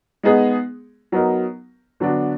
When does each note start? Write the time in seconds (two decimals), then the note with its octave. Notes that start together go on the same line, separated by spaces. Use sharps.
0.23 G#3 B3 D#4 G#4
1.12 F#3 B3 D#4 A#4
2.00 D3 F#3 B3 D4 F#4